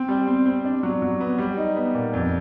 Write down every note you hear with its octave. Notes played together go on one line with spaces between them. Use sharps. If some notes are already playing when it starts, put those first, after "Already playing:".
Already playing: C4
G3
C4
C4
D4
F#3
F#3
B3
G3
D#4
B3
A#2
F2